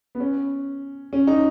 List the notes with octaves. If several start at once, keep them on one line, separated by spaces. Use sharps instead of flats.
B3
C#4
C#4
D#4